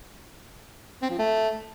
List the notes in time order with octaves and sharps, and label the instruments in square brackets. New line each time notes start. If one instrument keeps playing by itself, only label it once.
[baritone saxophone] C4
F3
A3